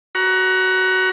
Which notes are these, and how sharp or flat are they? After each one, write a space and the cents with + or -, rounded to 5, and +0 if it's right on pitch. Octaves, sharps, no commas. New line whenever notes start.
F#4 +15 A#5 +25